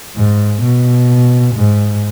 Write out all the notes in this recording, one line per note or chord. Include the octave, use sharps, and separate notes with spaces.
G#2
B2
G#2